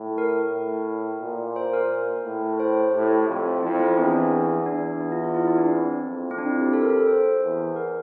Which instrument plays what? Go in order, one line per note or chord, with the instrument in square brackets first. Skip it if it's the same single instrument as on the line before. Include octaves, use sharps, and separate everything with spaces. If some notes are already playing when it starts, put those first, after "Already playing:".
Already playing: [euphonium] A2
[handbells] A#4
[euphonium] A2
A#2
[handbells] C5
A#4
[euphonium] A2
[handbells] C5
[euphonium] A2 [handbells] G4
[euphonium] F2
[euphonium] F2 [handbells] E4
[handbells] C4
[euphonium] E2 [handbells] D4
[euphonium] E2 [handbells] D4
[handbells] E4
F4
F4
E4
E4
D4
C4
[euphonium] F2
[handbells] C4
D4
E4
G4
A4
A#4
A4
C5
[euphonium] E2
[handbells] A#4